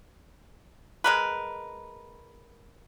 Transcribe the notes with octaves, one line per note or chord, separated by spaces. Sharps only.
G#3 A#4 B4